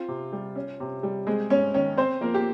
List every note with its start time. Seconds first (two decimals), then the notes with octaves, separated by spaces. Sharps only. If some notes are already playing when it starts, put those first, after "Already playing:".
Already playing: C4 F4
0.08 C3
0.33 G3
0.55 C#4
0.80 C3
1.03 G3
1.27 G#3 C4 G#4
1.50 G#2 C#4 C#5
1.74 D#3 C#4 C#5
1.97 C4 C5
2.21 F3 A#3 A#4
2.34 G4